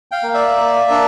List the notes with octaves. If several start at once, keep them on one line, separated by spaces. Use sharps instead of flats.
F5 G5
A#3
D5 E5
A#3
D4